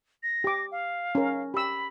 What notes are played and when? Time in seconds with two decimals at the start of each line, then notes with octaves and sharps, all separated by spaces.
0.23 A#6
0.44 G4 D6
0.72 F5
1.15 C#4 A#4
1.54 G4 B5 E6